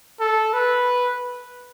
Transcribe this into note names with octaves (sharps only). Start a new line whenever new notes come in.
A4
B4